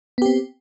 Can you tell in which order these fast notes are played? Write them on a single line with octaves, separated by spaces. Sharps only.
B3 G4 C4